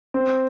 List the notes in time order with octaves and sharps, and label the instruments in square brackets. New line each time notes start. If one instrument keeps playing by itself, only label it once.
[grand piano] C4